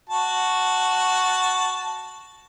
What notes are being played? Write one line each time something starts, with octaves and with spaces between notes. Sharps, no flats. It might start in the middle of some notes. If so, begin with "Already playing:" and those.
F#4 A5